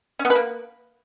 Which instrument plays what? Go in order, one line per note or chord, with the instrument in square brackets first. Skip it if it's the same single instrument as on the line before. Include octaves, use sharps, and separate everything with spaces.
[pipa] C#4
B3
B4
A#3